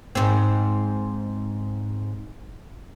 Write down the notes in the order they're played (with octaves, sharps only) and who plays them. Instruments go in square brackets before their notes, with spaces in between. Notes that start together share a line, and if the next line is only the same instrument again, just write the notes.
[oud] G#2 C4